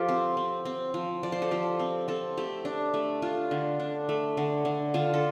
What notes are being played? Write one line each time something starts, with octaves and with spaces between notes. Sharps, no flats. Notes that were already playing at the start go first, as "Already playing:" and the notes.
Already playing: F3 F4 G4 A4
C4
C4
C4
F3
F3 D5
C5
A4
F3 G4
C4
C4 A4
A3 G4
D4
A3
D4 F4
D3
D4
A3
D3
D3
D3 F4
A4